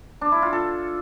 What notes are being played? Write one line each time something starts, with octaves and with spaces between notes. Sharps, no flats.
D4
E4
F4
A4